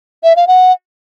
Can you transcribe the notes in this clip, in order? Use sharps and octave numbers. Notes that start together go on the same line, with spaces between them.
E5
F5
F#5